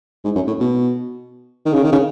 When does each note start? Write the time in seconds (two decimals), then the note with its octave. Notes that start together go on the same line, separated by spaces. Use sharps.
0.25 G#2
0.36 F#2
0.47 A2
0.60 B2
1.66 D#3
1.73 C#3
1.83 D#3
1.92 C#3